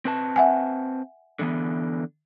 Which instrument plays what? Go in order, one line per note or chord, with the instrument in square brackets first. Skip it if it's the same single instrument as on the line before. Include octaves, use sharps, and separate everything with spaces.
[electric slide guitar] C4 B4 A5
[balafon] E5 F#5 G#5
[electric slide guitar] D3 E3 B3